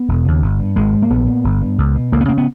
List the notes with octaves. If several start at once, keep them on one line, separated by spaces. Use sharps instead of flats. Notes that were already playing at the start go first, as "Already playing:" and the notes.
Already playing: B3
E1
D#2 C#3
G1
G2
G#1 G#3
G#2
A#3
A#1 B3
A#2
G1
G2
C#2
B2
C#2 A#3
B3
C#3 A#3
B3